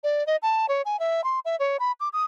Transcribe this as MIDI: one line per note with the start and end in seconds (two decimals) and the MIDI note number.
0.04 0.26 74
0.27 0.36 75
0.42 0.66 81
0.68 0.82 73
0.85 0.99 80
0.99 1.24 76
1.24 1.39 84
1.45 1.56 76
1.59 1.77 73
1.79 1.92 83
2.00 2.09 86
2.13 2.25 87